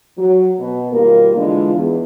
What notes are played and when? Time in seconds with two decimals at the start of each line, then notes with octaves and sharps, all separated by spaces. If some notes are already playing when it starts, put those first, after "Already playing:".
0.18 F#3
0.60 B2 B3
0.93 D#2 B2 G3 A#3 F4 A#4
1.37 D3 E3 G#3 D4 F4
1.74 E2